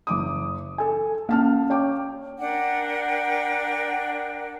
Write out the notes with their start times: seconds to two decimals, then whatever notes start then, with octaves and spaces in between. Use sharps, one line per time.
0.07 F#1 D6 D#6
0.78 A4 G#5
1.29 A#3 C#4 F5 A5 F6
1.70 C#5 G5 D6
2.39 D4 A#4 F#5 G5